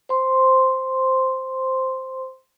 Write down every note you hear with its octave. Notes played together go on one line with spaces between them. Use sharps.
C5 C6